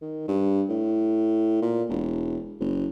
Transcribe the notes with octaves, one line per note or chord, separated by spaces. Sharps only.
D#3
G2
A2
A#2
E1
F#1